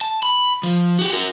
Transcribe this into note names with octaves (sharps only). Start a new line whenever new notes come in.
A5
B5
F3
F#4 G4
F#4 A#4